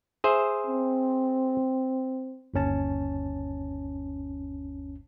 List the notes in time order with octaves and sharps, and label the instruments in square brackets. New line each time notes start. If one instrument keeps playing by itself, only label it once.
[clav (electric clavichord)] G#4 C5 E5
[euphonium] C4
[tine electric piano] G1 D#2 C#4 A5